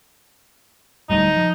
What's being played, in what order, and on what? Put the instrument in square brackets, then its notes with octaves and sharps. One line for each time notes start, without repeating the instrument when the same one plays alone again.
[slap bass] D1 G3 A3 [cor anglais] D#4
[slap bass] F3